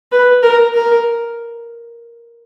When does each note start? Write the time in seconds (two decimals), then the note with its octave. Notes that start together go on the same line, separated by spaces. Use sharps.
0.12 B4
0.43 A#4
0.75 A#4